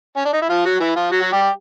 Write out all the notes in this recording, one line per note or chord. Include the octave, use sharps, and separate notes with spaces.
C#4
D4
D#4
E4
F3 F4
F#3 F#4
E3 E4
F3 F4
F#3 F#4
F#4
G3 G4